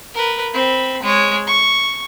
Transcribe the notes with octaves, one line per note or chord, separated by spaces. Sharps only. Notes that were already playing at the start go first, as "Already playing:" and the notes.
A#4 B4
C4 B5
G#3 C#5
C#6